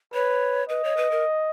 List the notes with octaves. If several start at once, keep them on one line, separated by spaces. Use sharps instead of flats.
B4 C#5
B4 D#5
C#5
B4
A#4